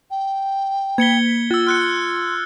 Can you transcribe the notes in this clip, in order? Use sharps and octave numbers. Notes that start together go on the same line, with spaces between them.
G5
A#3 G#6 B6 C#7 G7
F4 E6 A6
C6 F6 F#6 C#7